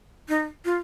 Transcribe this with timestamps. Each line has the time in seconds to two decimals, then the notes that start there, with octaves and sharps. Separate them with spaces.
0.29 D#4
0.65 F4